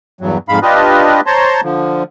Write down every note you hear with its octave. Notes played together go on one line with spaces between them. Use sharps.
E2 G2 F#3
F2 G#2 G#3 F5 B5
D4 F4 G4 B4 D#5
C5 C#5 A5 A#5 C6
D3 F3